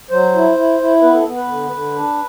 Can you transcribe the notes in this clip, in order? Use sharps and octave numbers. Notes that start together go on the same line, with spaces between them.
F#3 C5
E4
E4
E4
B3 B4
A4
B3
B4
D3
D3
D4